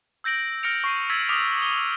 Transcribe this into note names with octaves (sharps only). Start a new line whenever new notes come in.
E6 G6 A#6 D7 F#7
E6 F6 A#6 C#7 D7 F7
C#6 C7 D#7
E6 G#6 A6 B6 F#7
D6 D#6 F6 B6 F7
D#7 G7